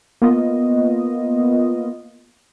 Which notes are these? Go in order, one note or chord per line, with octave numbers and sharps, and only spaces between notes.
A#3 B3 F4 D#5